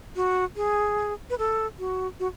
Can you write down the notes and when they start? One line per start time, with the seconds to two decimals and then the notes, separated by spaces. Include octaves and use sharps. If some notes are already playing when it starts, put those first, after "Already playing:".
0.16 F#4
0.56 G#4
1.30 B4
1.38 A4
1.79 F#4
2.20 F#4